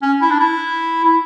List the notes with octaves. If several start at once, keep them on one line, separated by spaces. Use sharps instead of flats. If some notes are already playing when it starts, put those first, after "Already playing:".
C#4
E4
D4
E4
E4